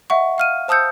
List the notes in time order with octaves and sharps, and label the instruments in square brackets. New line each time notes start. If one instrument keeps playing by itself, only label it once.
[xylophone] D#5 E5 F#5 C#6
F5 F6 D#7
C5 A5 D#6 E6 G6 C#7